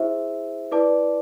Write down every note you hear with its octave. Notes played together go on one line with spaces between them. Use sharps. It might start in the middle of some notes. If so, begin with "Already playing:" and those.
Already playing: E4 G#4 C5 E5
E4 B4 D5 A5 D6